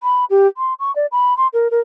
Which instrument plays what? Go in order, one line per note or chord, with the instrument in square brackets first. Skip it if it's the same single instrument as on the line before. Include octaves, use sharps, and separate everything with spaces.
[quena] B5
G4
C6
C#6
D5
B5
C6
A#4
A#4